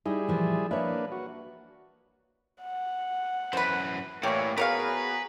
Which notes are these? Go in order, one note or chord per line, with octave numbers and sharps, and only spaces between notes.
G3 D#4 E4 G#4
A#2 E3 F3
A#3 D4 B4 C#5 E5
F#4
F#5
F#2 E3 B4 C5
A2 E3 G3 A#3 G4 C#5
B3 F#4 G#4 A#4 B4 C#5 F5 A#5